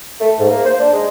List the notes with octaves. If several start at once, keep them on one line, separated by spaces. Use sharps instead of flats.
A3
G#2
A#3
C5
D4
G#3